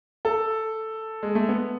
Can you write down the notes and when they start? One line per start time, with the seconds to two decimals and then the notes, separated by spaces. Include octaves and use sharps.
0.25 A4
1.23 G#3
1.35 A3
1.49 B3